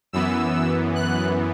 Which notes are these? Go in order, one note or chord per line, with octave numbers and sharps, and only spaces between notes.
F#2 E3 B3 E6
F#6